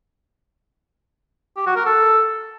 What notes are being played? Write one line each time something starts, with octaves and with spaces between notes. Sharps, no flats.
G4
F#4
A#4
A4